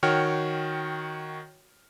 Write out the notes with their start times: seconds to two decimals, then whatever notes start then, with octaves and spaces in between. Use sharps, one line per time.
0.03 D#3 F#4 C#5 G5 F6